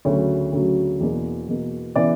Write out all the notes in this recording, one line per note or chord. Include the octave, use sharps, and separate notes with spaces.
D2 C#3 F#3 C#5
D2 C#3 F#3
E2 B2 A#3
E2 B2 A#3
C#3 E3 B3 D5